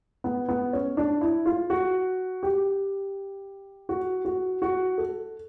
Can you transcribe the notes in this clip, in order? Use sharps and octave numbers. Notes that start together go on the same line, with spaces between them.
B3
B3
C#4
D4
E4
F4
F#4
G4
F#4
F#4
F#4
A4